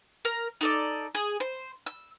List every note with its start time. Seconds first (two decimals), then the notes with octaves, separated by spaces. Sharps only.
0.25 A#4
0.61 D#4 A4 D5
1.15 G#4
1.40 C5
1.86 E6